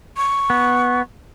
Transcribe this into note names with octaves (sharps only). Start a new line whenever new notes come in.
C#6
B3